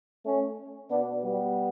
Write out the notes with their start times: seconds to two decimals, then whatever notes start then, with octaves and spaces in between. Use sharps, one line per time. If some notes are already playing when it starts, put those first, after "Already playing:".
0.26 A3 C#4
0.90 B2 B3 D4
1.24 G3 B3